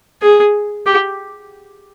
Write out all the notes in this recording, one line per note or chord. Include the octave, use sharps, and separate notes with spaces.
G#4
G4